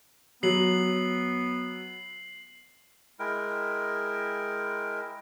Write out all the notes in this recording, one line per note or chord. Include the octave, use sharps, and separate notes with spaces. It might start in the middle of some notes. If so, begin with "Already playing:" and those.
F#3 B3 C7 F#7
G#3 E4 A#4 G5